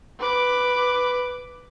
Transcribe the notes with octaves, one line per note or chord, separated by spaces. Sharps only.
B4 D6